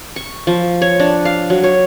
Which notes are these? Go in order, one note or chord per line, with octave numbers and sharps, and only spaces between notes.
C#6
F3
C#5
D4
F5
F#3
C#5